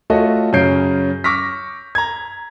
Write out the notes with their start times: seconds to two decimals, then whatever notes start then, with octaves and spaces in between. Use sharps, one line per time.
0.10 A3 F4 F#4 A4 C#5 D#5
0.53 F#2 C#3 C#4 G6 C7 D7
1.24 C#6 D6 E6 F6 A#6 B6
1.95 A#5 G#6